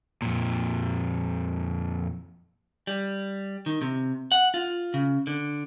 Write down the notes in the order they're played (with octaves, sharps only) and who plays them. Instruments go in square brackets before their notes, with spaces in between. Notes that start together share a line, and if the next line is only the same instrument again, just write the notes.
[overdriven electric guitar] F2 A#2
[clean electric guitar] G3
D#3
C3
F#5
F4
C#3
D3